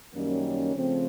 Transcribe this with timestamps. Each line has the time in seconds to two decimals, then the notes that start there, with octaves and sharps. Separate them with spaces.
0.13 F#2 D#3 G3 A#3 C#4
0.74 C#3 F3 A3 C4